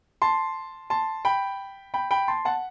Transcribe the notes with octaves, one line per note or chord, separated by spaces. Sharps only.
A5 C6
A5 C6
G5 B5
G5 B5
G5 B5
A5 C6
F#5 A5